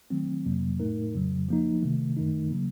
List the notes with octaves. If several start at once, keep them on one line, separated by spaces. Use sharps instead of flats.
D#3 F#3 A3 C4
F2 C3 F#3 A#3
A2 A3 D#4 A#4
F2 C#3 F#3
F3 A#3 D#4
C3 D#3 A3
F#2 D#3 A3 D#4
C#3 F#3 A#3